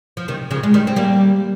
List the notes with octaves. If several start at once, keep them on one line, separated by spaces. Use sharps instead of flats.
F3
C3 D#3
C#3 F3
G#3
D#3 G3
C4
G3 A#3